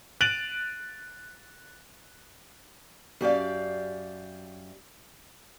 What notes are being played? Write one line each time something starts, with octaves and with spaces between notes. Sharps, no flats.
F#6 A6 D7 D#7 F7 F#7
F#2 G4 D5 F5